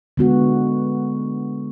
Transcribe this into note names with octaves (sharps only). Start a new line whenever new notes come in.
D3 G#3 B3 F#4